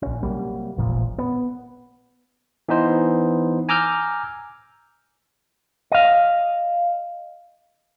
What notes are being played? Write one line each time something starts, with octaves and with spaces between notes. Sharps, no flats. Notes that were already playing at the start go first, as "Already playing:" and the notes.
A#1 C#4
C3 F#3 G3 A#3
E1 A1 A#2 F3
B3
E3 B3 D#4 C5
G#5 A#5 D6 E6 F6 G6
D#5 F5